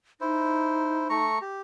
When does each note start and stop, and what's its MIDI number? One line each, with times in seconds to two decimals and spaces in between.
0.21 1.25 63
0.21 1.08 64
0.21 1.08 72
1.10 1.39 57
1.10 1.39 82
1.10 1.39 85
1.41 1.62 67